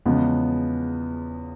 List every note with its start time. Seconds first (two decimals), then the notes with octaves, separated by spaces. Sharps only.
0.05 E2 C#3 F3 G#3 B3